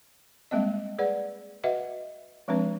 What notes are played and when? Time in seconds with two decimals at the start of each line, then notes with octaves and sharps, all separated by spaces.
0.51 G3 G#3 A#3 C4 D#5
0.98 G#4 B4 D5 F#5
1.64 F#4 B4 D#5 E5 F#5
2.48 F3 G#3 C4 D4 B4